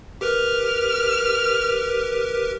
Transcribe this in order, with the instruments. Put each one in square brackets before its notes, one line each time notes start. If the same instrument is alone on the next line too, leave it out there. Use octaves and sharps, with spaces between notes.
[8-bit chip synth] G4 A#4 B4 [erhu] F6